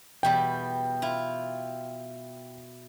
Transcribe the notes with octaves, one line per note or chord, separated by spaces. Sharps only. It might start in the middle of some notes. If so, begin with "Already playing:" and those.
E2 B2 G3 G5
E4 F4